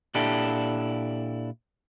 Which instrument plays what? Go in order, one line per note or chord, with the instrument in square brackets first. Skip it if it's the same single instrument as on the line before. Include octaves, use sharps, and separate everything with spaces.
[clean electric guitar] A#2 D4 E4 G4 A4